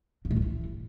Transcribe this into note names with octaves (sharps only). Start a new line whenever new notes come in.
C#3
A2
F3
E3